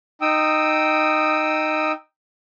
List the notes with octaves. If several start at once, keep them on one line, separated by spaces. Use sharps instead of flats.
D#4 G5 D#6 E6